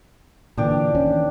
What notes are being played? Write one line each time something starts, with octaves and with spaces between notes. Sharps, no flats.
A#2 D3 E3 D4 G4
D#2 E3 C#4